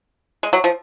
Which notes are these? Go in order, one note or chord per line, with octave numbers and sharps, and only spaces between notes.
G#3
F#3
F3